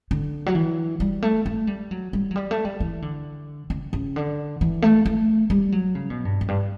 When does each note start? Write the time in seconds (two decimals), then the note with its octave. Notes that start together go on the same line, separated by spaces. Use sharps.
0.11 D3
0.46 F#3
0.55 E3
1.00 G3
1.22 A3
1.46 A3
1.67 G3
1.91 F#3
2.13 G3
2.31 F#3
2.36 G3
2.51 A3
2.65 G3
2.80 E3
3.02 D3
3.70 C#3
3.93 C#3
4.16 D3
4.61 E3
4.82 A3
5.06 A3
5.50 G3
5.72 F#3
5.95 C#3
6.10 B2
6.25 G2
6.41 F#2
6.48 G2